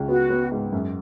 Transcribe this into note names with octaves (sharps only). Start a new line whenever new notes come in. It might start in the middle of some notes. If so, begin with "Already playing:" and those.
Already playing: C#2
B3 F#4
B3
G#2
F#2